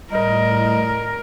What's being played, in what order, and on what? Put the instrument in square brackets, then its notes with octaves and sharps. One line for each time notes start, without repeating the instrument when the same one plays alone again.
[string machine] A2 [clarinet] G3 [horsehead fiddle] A#4 [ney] D#5